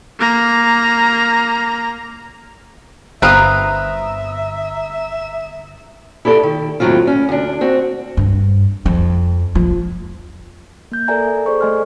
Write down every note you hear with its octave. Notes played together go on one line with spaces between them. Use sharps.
A#3 A#5
G1 C4 B4 E5 F5 A#5 D#6
E4 G4 A4 C#5 D5
D#3
D#2 A2 D3 F#3 C4 F4
C#4
D2 D4
C4 F#4
G2
F2
F3
A#3 G6
A4 A#4 D5 E5 G#5 A#5
G#4 A4 C5 D5 C#6
A3 D#5 G#5 C6 F6